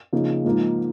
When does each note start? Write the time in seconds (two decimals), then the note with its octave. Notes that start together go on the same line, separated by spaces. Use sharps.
0.13 C#3 F3 A#3 D#4
0.45 G#2 F3 A#3 D#4